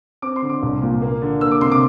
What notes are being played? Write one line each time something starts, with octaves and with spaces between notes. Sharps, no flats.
C4 D6
C6
D3
D6
C2
A#2
A#3
D3
A#3 E6
D6
C3 C6
D6